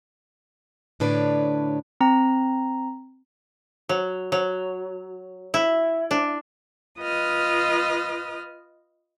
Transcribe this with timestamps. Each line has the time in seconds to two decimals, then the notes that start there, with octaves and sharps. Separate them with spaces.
1.00 A2 D3 D4 B4 C#5 D5
2.01 C4 A#5
3.89 F#3
4.32 F#3
5.54 E4
6.11 D4
6.99 F4 B4 D#5 D#6 F6